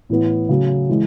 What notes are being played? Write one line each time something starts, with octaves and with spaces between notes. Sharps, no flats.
A2 E3 B3
C#3 F#3 A3 C#4
E3 G#3